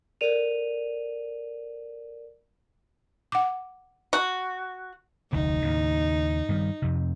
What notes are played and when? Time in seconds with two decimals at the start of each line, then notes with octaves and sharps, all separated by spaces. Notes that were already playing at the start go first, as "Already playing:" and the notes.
0.21 A4 A#4 D5 D#7 F7
3.32 F#5 D6
4.13 F#4
5.33 F1 D2 D#4
5.62 D#2 A2 C#3
6.49 G2 D#3 G3
6.82 F2 C3